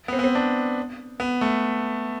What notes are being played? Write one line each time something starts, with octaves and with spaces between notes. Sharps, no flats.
B3
C4
B3
C4
D4
B3
A3